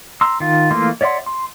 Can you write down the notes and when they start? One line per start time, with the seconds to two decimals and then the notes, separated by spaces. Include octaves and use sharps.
0.21 A#5 C6 E6
0.40 D#3 F4
0.71 E3 A3 A#3 F4 C6
1.01 C#5 D5 E5 F#5 C6
1.26 C6